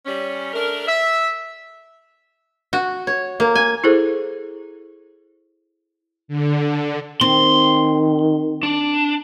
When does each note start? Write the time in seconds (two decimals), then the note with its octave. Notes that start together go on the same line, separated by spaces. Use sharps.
0.06 G3 C#4
0.54 A3 D4 A#4
0.88 E5
2.73 F#4
3.07 C#5
3.40 A#3
3.55 G#5
3.84 E4 G#4 A4 C5
6.28 D3
7.21 D#3 C4 C6
8.63 D4